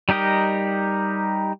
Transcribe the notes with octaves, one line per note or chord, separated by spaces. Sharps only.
G3 D#4 G4 A#4 D#5